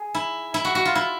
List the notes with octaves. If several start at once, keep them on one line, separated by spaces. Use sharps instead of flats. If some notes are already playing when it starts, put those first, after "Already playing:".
Already playing: G#4
E4
E4
F#4
F#4
F4
E4